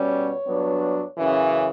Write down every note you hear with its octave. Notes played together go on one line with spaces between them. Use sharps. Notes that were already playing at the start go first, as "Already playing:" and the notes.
Already playing: B2 G3 C#4
C#5
G2 F#3 B3 D4
F#2 C#3 E3